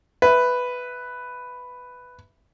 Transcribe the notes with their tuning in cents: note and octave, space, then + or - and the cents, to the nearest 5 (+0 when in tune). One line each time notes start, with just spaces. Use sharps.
B4 +5 E5 +0